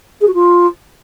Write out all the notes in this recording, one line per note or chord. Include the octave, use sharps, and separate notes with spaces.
G#4
F#4
F4